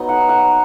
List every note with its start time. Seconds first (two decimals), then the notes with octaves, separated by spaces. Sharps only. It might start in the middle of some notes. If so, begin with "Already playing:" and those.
Already playing: F#3 B3 D#4 D#5
0.09 F#5
0.29 F#5